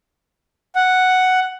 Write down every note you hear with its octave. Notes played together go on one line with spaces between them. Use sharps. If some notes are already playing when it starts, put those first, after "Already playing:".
F#5